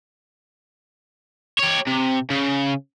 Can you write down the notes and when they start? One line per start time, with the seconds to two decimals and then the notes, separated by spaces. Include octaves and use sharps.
1.59 G4 C#5
1.87 C3
2.30 C#3